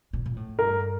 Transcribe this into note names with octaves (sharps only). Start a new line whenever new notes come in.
A#2
A#2
A2
G2 A#4